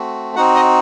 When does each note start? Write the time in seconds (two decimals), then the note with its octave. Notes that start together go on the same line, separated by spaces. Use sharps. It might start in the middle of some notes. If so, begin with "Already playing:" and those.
Already playing: A3 C4 F#4
0.36 C4 D#4 F#4 F#5
0.55 D#5